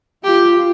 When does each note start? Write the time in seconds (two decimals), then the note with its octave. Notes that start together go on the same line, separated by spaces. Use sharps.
0.24 F4 G4